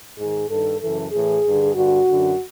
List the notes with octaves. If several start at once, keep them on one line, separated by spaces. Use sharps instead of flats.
G#2 D#3 G#4
G2 D#3 A4
F#2 C#3 E3 A4
A2 E3 G#4
G2 D3
G2 D3 F#4
F#2 D3